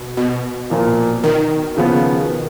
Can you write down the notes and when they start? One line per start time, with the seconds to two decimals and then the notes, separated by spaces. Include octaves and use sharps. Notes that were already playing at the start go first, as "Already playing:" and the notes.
Already playing: B2
0.17 B2
0.70 A#2 F3 A#3
1.24 D#3
1.77 C#3 F3 B3